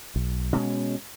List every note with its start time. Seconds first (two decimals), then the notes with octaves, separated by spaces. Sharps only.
0.16 B1
0.55 B2 G#3 C#4